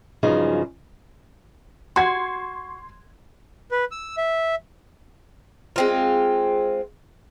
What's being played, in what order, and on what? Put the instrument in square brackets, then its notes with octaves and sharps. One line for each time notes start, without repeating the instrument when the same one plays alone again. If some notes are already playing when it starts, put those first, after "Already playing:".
[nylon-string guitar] G2 C#3 F3 F#3 D#4 G#4
[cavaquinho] F#4 [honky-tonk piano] C6 G#6
[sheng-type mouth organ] B4
E6
E5
[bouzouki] G#3 C4 F4